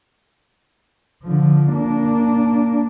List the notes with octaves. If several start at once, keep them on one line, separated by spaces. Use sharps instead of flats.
D3 F3
A#3 D4